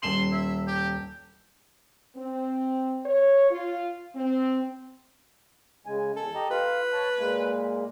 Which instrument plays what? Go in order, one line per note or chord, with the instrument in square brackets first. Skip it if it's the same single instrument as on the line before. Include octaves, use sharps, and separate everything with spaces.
[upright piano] D#1 E7 F#7 [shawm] C6
[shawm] E5
G4
[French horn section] C4
C#5
F4
C4
[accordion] C#3 G#3 G#5
[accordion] E2 [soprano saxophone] A4
[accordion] G4 D#5 A#5
[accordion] F4 F5 [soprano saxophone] B4
[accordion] C#5 A5
A#2 G#3 A#3